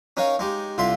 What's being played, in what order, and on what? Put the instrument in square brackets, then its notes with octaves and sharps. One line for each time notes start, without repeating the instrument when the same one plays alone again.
[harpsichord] C#4 D#4 A#4 C#5 F5
G#3 D#4 G4
C2 D3 F4 E5 C6